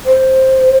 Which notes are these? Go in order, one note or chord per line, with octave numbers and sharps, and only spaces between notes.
C5